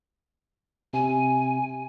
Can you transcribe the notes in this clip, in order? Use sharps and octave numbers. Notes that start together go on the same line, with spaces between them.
C3 G#5